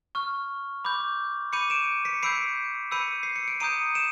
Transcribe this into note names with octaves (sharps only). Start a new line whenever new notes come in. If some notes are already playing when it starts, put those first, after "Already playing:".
C#6 F6
B5 D6 G6
B5 D6 G6 C#7 D#7
D7 E7
B6 C#7
B5 E6 G6 C7 D7
B5 E6 G6 C#7 D#7
C7
C#7
D7
A#5 D#6 G6 C#7 D#7
D7 E7